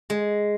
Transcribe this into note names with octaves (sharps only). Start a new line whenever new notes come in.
G#3